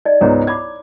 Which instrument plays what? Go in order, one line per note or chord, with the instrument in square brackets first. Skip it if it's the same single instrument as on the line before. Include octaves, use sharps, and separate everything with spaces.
[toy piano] D#4 D5 D#5
[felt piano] C#2 G#2 B3 [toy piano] C#5 A#5
[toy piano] E4 B5 D6 [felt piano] G#6